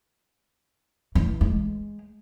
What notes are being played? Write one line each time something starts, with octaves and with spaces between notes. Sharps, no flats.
E3
G#3